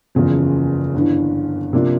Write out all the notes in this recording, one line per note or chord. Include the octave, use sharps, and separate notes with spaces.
F#1 E2 C#3 F3
G1 G2 E3
C3 F3 A#3 D4 F4